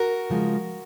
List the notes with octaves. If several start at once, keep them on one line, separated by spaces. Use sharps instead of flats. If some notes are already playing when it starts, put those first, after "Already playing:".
Already playing: F#4 A#4
C#3 F3 G#3